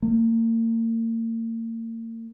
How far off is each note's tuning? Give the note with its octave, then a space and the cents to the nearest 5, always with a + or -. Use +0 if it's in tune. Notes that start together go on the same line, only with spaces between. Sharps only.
A#3 -40